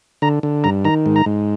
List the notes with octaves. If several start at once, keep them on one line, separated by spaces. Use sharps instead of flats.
D3 A#5
D3
G2 A#5
D#3 A#5
G#2
A#5
G#2